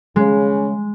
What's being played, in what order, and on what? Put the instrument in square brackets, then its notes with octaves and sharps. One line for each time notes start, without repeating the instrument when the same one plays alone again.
[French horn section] C#3 [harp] G#3